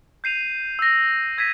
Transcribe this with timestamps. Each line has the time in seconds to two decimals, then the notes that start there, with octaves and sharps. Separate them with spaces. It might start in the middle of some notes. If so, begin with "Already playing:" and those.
0.24 G6 C7 D#7 F7
0.79 E6 A#6
1.38 E6 G#6 A#6 B6 D#7